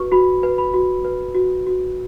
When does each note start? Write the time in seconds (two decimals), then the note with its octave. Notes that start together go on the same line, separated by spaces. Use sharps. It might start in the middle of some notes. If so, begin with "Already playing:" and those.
Already playing: F#4 B4 C#6
0.12 F#4 B5
0.43 B4
0.58 B5
0.74 F#4
1.05 B4
1.35 F#4
1.67 F#4